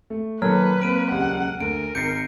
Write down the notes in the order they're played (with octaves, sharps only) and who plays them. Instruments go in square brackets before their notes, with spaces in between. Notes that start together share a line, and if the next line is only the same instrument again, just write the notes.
[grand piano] A3
[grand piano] A#2 D#3 A4 [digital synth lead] F#3 [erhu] B4 [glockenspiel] F6
[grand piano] A#3 C4 [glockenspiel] F6 D7 D#7
[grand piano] D#1 C#2 G4 [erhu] F#5
[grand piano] D2 [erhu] A#4 [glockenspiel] D7
[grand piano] G#1 A6 [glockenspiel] G6 C7 [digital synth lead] C#7